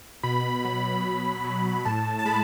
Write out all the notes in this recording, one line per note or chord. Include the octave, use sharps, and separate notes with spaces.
B2 B5
F#3
B2
F#3
A2 A5
A5
G#3 B5